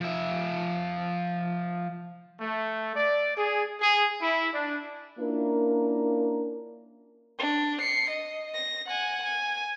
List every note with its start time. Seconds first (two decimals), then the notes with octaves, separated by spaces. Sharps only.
0.01 F3 E5
2.39 A3
2.96 D5
3.36 G#4
3.81 G#4
4.21 E4
4.53 D4
5.19 A#3 C#4 D4 E4 F4 A#4
7.38 D4
7.80 C7 C#7
8.11 D#5
8.54 A#6
8.87 F#5 G#5
9.23 G#5